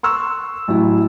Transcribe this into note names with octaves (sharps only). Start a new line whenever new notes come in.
C6 C#6 E6 F#6
A1 F#3 E4